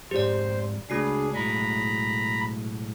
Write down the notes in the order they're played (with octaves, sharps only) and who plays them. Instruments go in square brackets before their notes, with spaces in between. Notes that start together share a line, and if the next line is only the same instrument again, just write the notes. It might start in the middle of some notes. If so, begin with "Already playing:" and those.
[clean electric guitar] F2 G#2 [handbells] G4 D5 [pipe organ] C5
[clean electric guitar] C#2 [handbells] A3 F#4 C7 [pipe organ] D4 G#4
[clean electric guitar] B1 A2 G#3 [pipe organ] A#5 B5